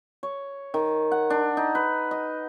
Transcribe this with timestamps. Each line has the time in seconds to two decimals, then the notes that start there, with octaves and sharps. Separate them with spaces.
0.23 C#5
0.74 D#3
1.12 F#5
1.30 D4
1.57 D#4
1.75 B4
2.11 D#5